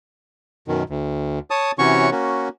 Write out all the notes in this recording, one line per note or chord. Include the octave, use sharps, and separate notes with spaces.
F#2 B2 D#3
D2
C#5 A5 D#6
C3 E3 C#4 F#4 C#5 C#6
A#3 C#4 F#4